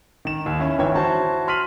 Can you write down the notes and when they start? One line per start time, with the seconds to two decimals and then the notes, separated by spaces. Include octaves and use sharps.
0.25 D#3 E7
0.46 D#2
0.60 C#4 E4
0.78 G1 D#3 E3 C#5 G5 G#6
0.96 E4 F#4 C5 A5 C#6
1.48 C6 F6 B6 D#7 F#7